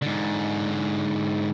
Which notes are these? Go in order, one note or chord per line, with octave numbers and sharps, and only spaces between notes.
G#2 D3